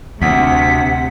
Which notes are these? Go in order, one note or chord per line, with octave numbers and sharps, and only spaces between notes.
D2 C3 F#5 B6